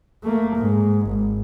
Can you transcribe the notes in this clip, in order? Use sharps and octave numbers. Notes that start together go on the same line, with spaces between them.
A3 A#3
G#2
G#1